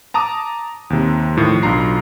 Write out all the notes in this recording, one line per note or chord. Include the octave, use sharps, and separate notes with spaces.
A5 A#5 D6 D#6
D#2 C3
A2 D#3 F3
B1 D4 F4 A#5 C7